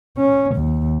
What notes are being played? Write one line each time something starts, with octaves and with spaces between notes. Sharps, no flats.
C#4
D#2